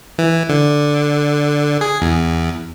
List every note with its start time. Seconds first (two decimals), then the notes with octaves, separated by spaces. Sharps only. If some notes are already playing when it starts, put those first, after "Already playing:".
0.19 E3
0.49 D3
1.81 G#4
2.02 E2